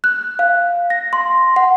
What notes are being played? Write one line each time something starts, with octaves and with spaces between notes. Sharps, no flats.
F#6
F5
A#6
C6
F#5